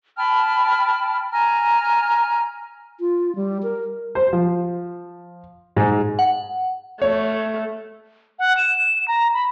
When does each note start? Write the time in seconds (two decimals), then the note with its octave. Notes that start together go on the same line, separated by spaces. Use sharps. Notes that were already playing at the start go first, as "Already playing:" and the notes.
0.17 G5 A5 B5 F6
1.32 G#5 A#5 F6
3.00 F4
3.36 G3
3.63 A#4
4.15 C5
4.33 F3
5.76 G#2
6.19 F#5
7.02 A3 C#5
8.39 F#5
8.57 E7
9.08 A#5
9.34 B5